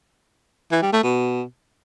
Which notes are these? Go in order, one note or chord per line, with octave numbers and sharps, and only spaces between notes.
E3
G3
A3
B2